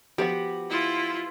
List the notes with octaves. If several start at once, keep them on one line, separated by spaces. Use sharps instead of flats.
F3 B3 F#4 G4
E4 F4